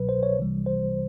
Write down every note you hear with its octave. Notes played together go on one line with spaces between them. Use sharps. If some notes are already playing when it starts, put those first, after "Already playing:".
Already playing: C2 B2 F#3 B4
C5
C#5
C2 C3 E3 G3
C5